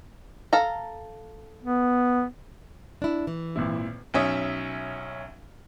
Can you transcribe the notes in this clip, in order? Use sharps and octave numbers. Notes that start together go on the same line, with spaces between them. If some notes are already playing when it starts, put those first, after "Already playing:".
A4 F5 A#5
B3
D4 E4
E3
G#1 A#2 E4
B1 C#4 E5 D#6